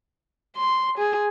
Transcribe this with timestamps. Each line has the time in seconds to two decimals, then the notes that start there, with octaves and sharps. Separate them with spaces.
0.57 C6
0.98 G#4